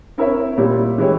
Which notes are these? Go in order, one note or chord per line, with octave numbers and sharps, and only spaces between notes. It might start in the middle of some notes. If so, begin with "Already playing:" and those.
C4 E4 A#4 C#5 E5
A#2 G3 C#4 E4
E3 G#3 E4 G4 C#5